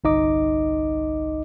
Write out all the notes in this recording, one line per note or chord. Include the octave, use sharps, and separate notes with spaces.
G1 C2 D#4 D#5 D6